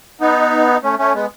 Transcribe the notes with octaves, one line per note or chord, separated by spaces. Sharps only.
B3 D#4
A3 C#4
A3 C#4
G#3 B3